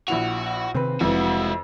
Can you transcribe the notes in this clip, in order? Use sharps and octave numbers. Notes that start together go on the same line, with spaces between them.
A#1 E4 F#4 F7
C3 D#3 C4 B4
F1 F2 E3 G#3 C4 E4 F#4